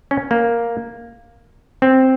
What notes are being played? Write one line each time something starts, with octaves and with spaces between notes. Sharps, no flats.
C#4
A#3
C4